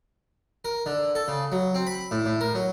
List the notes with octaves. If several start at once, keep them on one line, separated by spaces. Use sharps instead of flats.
A#4
D3
A4
C#3
F#3
C4
B5
A2
A2
A#4
F#3